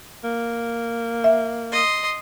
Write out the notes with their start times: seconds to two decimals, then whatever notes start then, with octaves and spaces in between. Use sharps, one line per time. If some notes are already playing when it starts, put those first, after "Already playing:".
0.24 A#3
1.24 E5
1.72 D#5 C6